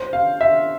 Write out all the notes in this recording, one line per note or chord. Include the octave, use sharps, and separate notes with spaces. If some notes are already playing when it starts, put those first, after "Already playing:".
Already playing: C5
F5
E5